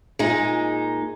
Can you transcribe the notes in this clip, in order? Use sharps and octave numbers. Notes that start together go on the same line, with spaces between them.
A#2 G#3 D#4